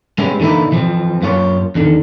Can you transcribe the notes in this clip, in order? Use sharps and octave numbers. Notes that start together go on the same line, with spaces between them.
G#3 B3 C#4 E4 G4
D3 E3 A#3 D#4 E4
E3 F3 C4
F#2 A#3 F4 G#4 C#5
E2 D3 D#3